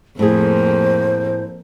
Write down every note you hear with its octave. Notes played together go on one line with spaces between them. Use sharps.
F2 A2 A#3 B3 G#4 C5